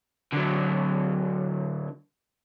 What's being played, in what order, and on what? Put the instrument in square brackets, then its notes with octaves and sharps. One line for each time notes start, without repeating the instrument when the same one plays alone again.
[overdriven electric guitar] D3 F#3